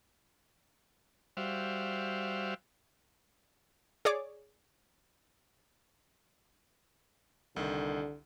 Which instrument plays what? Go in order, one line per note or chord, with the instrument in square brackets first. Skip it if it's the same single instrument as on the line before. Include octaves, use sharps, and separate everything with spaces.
[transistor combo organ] G3 F#4 C5 E5 F5
[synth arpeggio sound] G#4 C#5 D5 D6
[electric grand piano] C2 D#3 [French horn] D3